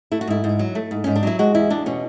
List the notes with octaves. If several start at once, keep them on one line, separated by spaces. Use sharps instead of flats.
A3 E4
F#4
G#2 E4
G#2
F#3
A3
G#2
G#2 C#4
D4
F#3 E4
G#3 F#4
E2 E4
E2 D4
B2 C#4